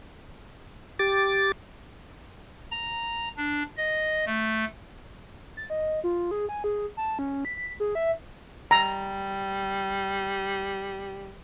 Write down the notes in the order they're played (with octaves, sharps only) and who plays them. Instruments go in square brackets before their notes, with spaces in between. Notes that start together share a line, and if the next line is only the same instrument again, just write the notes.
[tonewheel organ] G4 D6 A6
[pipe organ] A#5
D4
D#5
A3
[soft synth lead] A6
D#5
F4
G#4
G#5
G#4
A5
C#4
B6
G#4
E5
[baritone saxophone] G3 [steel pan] A#5